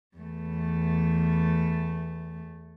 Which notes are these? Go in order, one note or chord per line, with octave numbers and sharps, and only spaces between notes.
E2 A3